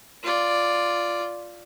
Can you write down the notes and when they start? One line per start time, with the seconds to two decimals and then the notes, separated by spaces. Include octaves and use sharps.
0.23 F4 D5